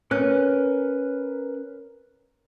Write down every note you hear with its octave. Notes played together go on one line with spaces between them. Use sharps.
C#4 A#4 B4 F#6